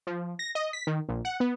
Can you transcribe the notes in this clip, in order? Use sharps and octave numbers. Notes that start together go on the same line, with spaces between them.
F3
A#6
D#5
B6
D#3
A#1
F#5
B3